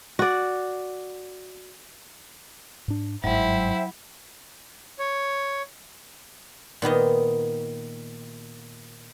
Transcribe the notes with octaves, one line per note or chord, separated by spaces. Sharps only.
F#4 D5
G#2 D4
G1 G#2 F#3 E4 C5 E5 G5
C#5
A#2 D#3 B3 D#5